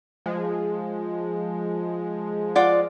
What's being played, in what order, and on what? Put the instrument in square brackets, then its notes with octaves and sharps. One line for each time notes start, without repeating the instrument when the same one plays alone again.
[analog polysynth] F3 G#3
[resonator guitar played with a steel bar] F4 D5 F#5